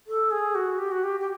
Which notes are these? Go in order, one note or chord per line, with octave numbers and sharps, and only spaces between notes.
A4
G#4
F#4
G4
F#4
G4
G4